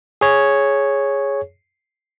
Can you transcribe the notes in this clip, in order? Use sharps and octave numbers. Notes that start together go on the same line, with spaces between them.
G#4 C#5